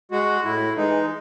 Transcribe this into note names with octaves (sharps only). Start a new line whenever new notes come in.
G#3 F#4
A2 E4
E3 G#3 D#4